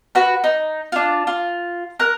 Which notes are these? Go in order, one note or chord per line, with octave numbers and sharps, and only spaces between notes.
F#4 B4
D#4
D4 F4
F4
A#4 F#6